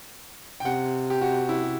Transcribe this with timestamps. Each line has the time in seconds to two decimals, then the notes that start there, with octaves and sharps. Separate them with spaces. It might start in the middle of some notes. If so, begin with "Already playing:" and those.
0.60 G5
0.65 C3 F#5
1.10 G4
1.21 F#4
1.49 E4